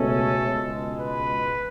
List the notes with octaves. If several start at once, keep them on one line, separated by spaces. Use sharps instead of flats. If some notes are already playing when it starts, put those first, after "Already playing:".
Already playing: C#2 B2 A3 C#4 A4
C#2 B2 G#3
B4